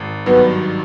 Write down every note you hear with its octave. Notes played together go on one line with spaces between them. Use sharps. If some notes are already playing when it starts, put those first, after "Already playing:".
Already playing: G#1
G2 D#3 F#3 B3